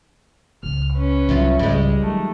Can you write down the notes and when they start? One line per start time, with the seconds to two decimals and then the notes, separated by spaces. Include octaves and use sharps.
0.63 C#2 C4 F6
0.94 C#4 B4
1.29 C2 F#3 E4 F4
1.59 C#2 G#2 G3 G#3
2.01 D#3 F#3 A3